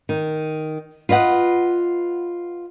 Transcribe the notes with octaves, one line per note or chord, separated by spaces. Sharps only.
D#3
F4 B4 D#5 F#5